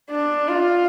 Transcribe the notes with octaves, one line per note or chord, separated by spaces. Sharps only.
D4
F4